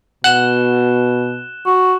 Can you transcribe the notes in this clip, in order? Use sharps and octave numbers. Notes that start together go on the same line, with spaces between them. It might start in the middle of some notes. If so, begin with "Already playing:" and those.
B2 F#5 F#6 E7 G7
F#4